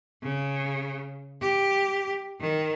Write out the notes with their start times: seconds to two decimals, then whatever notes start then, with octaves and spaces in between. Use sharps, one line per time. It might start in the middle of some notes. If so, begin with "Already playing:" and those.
0.23 C#3
1.42 G4
2.40 D#3